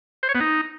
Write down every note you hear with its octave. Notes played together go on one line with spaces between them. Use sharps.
C5
C#5
B3
D#4